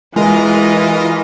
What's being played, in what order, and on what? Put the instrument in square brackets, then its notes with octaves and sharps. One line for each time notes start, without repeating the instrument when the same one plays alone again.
[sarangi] E3 [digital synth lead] G#3 [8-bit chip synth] F4 A#4 D#5